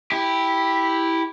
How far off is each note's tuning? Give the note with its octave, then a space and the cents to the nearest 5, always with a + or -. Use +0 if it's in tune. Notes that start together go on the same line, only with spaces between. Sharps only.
E4 -5 G4 +0